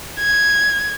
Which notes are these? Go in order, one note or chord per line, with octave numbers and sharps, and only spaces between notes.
G#6